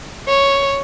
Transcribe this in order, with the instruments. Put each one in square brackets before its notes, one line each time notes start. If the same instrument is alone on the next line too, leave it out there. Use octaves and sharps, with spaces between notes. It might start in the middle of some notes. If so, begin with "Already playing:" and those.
[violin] C#5